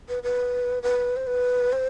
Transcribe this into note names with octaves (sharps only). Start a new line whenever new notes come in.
B4
B4
B4
C5
B4
C5